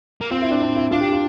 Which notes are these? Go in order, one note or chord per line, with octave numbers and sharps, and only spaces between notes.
A#3
C4 F4
E4
D4
D4
E4
D4 F4
G4
F4